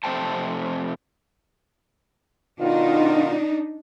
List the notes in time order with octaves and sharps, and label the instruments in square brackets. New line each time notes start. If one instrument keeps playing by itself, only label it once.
[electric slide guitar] F2 C3 A3 C5 G5 A5
[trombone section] B2 D#3 F4 [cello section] D4 D#4